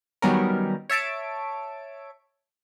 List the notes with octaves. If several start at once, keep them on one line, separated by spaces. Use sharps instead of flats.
D#3 F#3 G3 B3 C#4 A#4
C#5 E5 A5 D7